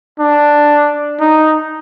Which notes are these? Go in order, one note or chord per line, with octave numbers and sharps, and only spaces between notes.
D4
D#4